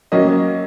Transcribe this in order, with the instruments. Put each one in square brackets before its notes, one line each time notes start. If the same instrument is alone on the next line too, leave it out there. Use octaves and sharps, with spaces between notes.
[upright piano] F#3 A#3 C#4 D#5